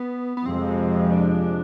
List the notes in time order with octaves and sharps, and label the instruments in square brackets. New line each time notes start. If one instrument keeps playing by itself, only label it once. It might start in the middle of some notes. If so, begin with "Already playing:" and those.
Already playing: [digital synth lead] B3
B3
[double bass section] F2 C3 F3 G#3 [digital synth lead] C4
[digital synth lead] D4